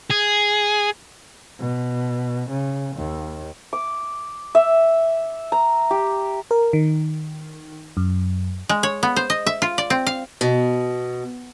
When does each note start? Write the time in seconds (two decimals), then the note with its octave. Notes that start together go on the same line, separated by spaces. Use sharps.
0.11 G#4
1.60 B2
2.50 C#3
2.97 D#2
3.73 D6
4.55 E5
5.52 A#5
5.91 G4
6.51 A#4
6.73 D#3
7.97 F#2
8.69 G#3
8.83 C#5
9.03 B3
9.16 C5
9.30 D#5
9.46 E5
9.62 F4
9.78 D5
9.90 C4
10.07 F5
10.41 B2